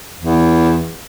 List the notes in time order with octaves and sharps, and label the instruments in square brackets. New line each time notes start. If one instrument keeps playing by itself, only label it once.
[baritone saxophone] E2